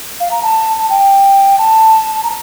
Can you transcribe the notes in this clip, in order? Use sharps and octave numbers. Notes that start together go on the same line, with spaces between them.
F5
A#5
A5
A5
G5
A5
A#5